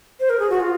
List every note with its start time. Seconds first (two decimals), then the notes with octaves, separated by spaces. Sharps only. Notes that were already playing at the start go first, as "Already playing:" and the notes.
0.20 C5
0.30 A#4
0.40 G#4
0.50 F#4
0.60 F4